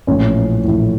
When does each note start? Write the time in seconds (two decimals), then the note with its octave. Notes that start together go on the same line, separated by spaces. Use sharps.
0.07 A#1 A2 E3 C#4
0.64 A#1 A2 E3